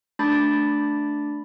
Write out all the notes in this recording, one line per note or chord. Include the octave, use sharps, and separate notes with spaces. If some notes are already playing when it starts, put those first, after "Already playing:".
A3 D4 A5 B5 D6 A6